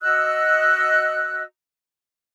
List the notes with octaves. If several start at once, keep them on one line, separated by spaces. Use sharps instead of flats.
F#4 D#5 E6 F#6